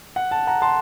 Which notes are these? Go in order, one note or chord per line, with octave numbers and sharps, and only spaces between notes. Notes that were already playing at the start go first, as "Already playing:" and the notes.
F#5
A5
F#5 A#5
A5 C6